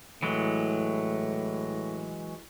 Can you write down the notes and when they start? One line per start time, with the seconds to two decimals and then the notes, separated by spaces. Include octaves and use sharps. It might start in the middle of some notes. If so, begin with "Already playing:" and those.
0.23 A2 E3 F#3 G#3